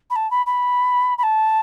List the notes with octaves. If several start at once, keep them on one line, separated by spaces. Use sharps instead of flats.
B5
A5
B5
B5
B5
A5